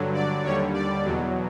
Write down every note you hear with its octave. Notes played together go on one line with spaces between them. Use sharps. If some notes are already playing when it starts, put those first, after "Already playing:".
Already playing: G2 D3 F#3
D5
D#2 D3 G3 C#5
D5
E2 B2 F#3